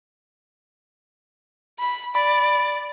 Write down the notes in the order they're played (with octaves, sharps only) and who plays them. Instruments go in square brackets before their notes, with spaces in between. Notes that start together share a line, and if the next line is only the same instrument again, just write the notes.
[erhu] B5
[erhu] D5 [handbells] B5